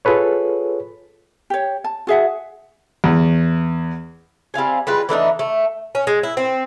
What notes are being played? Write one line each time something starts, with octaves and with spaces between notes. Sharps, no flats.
F4 G#4 A4 B4 C#5
G4 C#5
A5
F#4 G#4 E5 F#5
E2
G3 C4 F5 G#5
G3 G#3 F4 B4
E3 A3 D4 D#4
A3
C#4
G#3
E4
C4